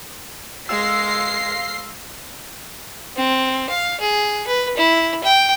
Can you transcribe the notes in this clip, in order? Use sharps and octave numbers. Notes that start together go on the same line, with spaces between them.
G#3 F5 C6 E6 A#6 C7
C4
F5
G#4
B4
E4
G5